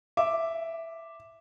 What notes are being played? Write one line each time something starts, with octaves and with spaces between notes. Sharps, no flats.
E5 D6